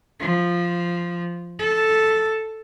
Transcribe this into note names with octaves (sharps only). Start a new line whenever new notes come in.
F3
A4